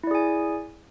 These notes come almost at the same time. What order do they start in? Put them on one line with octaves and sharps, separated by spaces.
E4 D5 G#4 G#5